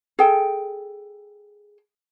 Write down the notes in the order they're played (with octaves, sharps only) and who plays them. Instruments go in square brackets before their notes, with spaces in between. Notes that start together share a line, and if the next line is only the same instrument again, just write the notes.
[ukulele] G#4 A4 G5